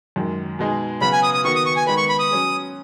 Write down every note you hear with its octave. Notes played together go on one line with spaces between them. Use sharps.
F#2 D#3 G#3
B2 G#3 D#4 G#4
C#3 F#3 B3 F#4 B5
G#5
D#6
D#6
D#3 B3 F#4 C#6
D#6
C#6
G#5
D#3 G#3 B3 B5
C#6
B5
D#6
F#3 C#4 G#4